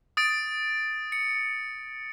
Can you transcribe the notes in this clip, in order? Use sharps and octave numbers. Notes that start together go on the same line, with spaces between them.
D#6 A6 D7
C#7